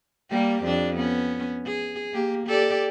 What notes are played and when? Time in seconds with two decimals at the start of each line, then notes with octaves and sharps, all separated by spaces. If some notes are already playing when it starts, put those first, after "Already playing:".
0.30 G3 A#3 G4
0.63 F2 D4
0.97 B3 C#4
1.66 G#4
2.13 A#3 G4
2.46 G4 A4 D5